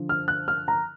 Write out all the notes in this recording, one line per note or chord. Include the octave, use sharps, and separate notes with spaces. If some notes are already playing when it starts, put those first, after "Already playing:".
Already playing: D3 F3
F6
F#6
F6
A#5